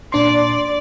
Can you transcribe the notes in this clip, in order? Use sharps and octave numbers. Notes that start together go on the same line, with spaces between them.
A#2 D4 D5 C6